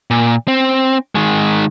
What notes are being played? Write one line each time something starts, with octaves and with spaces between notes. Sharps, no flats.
A#2
C4
D#3 G#3